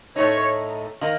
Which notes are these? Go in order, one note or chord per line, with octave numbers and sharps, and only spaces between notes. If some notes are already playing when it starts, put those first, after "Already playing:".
A2 A3 D#4 C#5
D#3 A#3 D#4